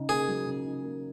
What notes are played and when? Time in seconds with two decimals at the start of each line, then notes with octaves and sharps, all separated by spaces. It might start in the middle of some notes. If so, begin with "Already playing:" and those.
Already playing: C#3 D#4
0.09 A#3 G#4
0.28 F#3
0.47 C#3
0.65 D#4
0.84 A#3